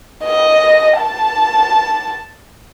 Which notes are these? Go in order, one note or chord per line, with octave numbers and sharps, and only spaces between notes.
D#5
A5